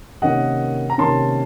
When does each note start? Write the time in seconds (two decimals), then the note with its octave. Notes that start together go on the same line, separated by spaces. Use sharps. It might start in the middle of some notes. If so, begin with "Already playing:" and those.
0.22 C3 D#3 A#3 C#4 D#5 F#5
0.90 A#5
0.98 C3 D#3 A#3 C#4 A5 C6